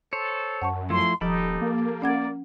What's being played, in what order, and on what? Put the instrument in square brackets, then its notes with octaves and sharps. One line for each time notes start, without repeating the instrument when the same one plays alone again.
[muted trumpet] A4 [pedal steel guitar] C5 C#5
[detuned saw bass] F#2 [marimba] F#5 A5 C#6
[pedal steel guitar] F3 A3 E4 [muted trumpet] C6
[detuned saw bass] D#1 [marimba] F3 [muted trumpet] D#4 [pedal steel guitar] G4 A4 B5
[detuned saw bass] A#3
[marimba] C#4 F#5 G#6 [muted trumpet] D5